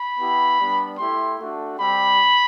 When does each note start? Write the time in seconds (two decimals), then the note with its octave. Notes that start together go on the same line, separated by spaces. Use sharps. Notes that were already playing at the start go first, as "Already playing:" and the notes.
Already playing: B5
0.18 B3 E4 G4
0.58 G3 B3 D4
0.98 A3 E4 G4 C6
1.37 A3 D4 F#4
1.78 G3 C4 G4 B5